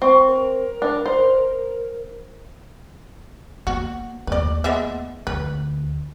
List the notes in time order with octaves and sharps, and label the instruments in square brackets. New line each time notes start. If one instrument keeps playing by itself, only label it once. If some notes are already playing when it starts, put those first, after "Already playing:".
[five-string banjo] C4 [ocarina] C#6
[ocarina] A#4
[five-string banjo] D4
C5
[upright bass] A#3 [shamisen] F#4
[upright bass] D#2 A3 [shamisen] B4 D5
[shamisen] G#3 B3 E5
[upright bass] D2 [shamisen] B4